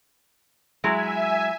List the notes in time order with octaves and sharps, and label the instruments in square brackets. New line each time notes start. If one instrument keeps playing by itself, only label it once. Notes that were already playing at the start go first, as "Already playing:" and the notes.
[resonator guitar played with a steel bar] F#3 G#3 E4 [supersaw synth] E5 G#5